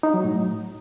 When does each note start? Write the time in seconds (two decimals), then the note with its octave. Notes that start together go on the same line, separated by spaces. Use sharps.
0.03 D#4
0.14 F#3
0.24 A2